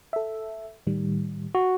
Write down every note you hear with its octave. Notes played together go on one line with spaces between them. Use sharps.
A4 E5
A2 D#3 G3
F#4